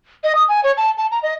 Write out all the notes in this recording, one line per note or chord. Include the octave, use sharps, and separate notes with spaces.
D#5
D#6
G#5
C#5
A5
A5
A#5
D#5